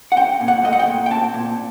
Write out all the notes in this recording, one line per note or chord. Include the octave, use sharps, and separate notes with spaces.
F#5
C4 G5
A#2
F#5
A3 D#5
F#5
G5
A#2
G5
C4 A5
A#2